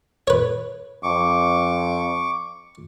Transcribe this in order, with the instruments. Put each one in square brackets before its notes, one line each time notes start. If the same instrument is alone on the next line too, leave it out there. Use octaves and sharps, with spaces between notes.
[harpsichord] B4 C#5
[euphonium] F2 [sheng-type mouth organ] C#6 D6